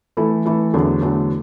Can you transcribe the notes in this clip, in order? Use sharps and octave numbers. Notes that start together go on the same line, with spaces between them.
E3 A3 E4 A4
E3 A3 E4 A4
E2 D3 F#3 A3
E2 D3 F#3 A3